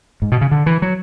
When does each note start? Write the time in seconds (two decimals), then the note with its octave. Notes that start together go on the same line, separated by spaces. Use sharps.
0.22 G#2
0.32 B2
0.41 C#3
0.52 D3
0.66 E3
0.82 F#3